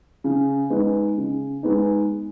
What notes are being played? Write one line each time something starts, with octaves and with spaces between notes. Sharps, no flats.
C#3
G#3 B3 D#4
C#3
G#3 B3 D#4